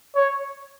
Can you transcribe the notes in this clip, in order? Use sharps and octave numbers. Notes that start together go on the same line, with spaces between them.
C#5